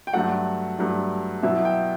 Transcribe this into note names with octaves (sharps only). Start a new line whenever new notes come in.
G5
G2 F#3 A3 F#5
G2 F#3 A3
B2 F#3 B3 E4 E5
G5